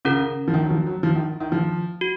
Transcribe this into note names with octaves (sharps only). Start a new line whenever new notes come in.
C#3 C#4 F4 A#4
F3
D#3
F#3
F3
F#3
F3
D#3
D#3
F3
F#4